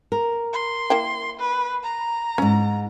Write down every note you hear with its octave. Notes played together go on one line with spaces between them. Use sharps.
A#4
C6
A#3 E4 G5
B4
A#5
F2 G#2 C#4